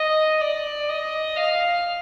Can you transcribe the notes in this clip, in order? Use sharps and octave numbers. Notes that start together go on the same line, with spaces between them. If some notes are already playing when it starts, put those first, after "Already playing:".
Already playing: D#5
D5
D#5
F5